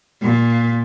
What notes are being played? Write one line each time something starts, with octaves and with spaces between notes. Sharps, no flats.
A#2